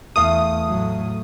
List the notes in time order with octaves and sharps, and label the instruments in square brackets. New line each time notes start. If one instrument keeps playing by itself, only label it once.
[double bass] E2 [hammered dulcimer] A3 F5 [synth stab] D#6
[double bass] A2 F#3